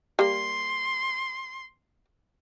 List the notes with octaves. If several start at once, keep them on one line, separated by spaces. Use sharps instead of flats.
G3 A#3 C6